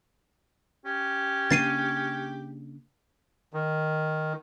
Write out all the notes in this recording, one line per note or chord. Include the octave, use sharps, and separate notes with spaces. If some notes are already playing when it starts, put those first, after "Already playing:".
C#4 G4
C#3 A#3 D4 A6 C7 D#7
D#3